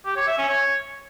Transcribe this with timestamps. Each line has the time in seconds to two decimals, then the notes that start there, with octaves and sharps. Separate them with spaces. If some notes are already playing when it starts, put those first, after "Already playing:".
0.06 G4
0.16 C#5
0.27 E5
0.38 C#4
0.49 C#5